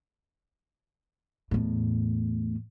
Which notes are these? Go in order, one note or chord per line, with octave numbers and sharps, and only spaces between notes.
E2 A2